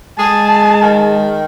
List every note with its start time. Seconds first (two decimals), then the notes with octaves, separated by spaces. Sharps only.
0.19 G#3 G#4 A5
0.82 D#3